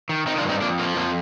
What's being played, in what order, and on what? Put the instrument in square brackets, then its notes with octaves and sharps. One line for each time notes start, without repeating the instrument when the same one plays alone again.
[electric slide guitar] D#3
D#3 C4 D#4
D4 F4
G2
C4 D#4
F2 A#3 D4
F3 A#3
F2 A#3